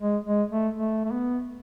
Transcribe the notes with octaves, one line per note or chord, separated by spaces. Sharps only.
G#3
G#3
A3
A3
A3
B3